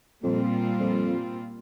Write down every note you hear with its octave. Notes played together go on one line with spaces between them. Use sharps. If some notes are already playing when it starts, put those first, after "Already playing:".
F2 A#2 G3 C4 F4
F2